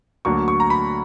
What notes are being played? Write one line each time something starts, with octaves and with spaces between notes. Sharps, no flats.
D2 D3 F#3 A#3 C#6
C#6
A#5
B5